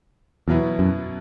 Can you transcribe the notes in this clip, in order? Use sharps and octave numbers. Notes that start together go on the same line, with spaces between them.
E2 B2 F#3 B3 E4
F#2